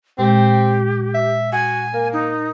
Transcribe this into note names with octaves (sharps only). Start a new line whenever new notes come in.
A#2 G#3 C4 G4
E5
F#4 G#5
A#3 A#4
D#4